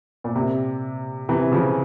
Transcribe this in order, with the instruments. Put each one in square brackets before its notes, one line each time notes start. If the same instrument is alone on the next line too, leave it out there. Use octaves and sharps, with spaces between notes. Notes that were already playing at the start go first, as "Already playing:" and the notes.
[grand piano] A#2
C3
C3 E3
C#3 F3